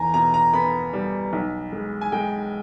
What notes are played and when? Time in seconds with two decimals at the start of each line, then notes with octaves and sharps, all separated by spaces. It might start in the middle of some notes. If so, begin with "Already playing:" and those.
Already playing: E2 G#5 A#5
0.14 B2 A#5
0.34 A#5
0.53 B3 B5
0.93 G3
1.33 B1
1.73 G#3
2.01 G#5
2.12 G#3 G5